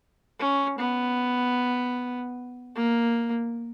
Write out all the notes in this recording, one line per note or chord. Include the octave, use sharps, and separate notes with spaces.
C#4
B3
A#3